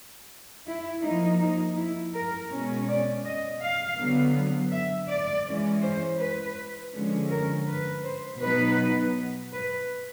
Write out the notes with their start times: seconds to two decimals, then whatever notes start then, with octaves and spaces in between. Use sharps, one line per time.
0.66 E4
1.03 F3 A#3 D#4
1.40 D#4
1.77 E4
2.15 A#4
2.51 B2 G#3 C#4
2.88 D5
3.25 D#5
3.61 F5
3.98 D3 F#3 B3
4.72 E5
5.09 D5
5.46 E3 G#3 C#4
5.83 C5
6.20 B4
6.93 D3 F3 G#3 C#4
7.31 A#4
7.68 B4
8.04 C5
8.41 B2 F#3 B3 D#4 B4
9.52 B4